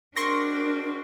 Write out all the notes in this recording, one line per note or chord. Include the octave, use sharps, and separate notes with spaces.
G#3 C4 D4 F#4 A#4 C6 C#6 A#6